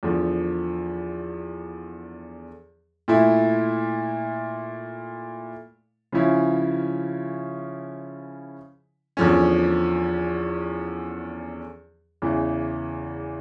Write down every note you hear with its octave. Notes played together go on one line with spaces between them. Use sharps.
E2 D3 F3
A#2 A3 E4
C#3 F3 C#4 E4
E2 D3 F3 C#4
E2 C#3 E3